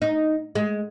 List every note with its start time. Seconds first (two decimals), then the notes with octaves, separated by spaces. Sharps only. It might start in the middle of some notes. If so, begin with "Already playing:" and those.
0.02 D#4
0.55 G#3